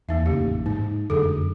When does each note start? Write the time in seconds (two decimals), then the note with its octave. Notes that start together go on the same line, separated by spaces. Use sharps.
0.09 E2 A#3 D#4 E5
0.26 F1 C#3 A#3 G4
0.41 A1
0.66 G#2 D#4
1.10 F1 F#2 D3 G#4 A4